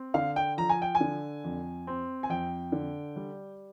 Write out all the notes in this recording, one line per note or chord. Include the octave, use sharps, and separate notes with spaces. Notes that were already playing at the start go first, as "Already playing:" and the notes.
Already playing: C4
D3 F5
G5
F3 A#5
G#5
G5
G#5
D3
F2
C4
G#5
F2 G5
D3
G3